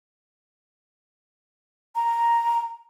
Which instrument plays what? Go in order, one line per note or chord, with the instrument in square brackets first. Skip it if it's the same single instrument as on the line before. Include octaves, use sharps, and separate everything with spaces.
[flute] A#5